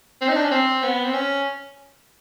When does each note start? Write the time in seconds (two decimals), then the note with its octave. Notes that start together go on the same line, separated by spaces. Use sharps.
0.21 C4
0.29 D#4
0.36 D4
0.44 C#4
0.51 C4
0.83 B3
1.04 C4
1.14 C#4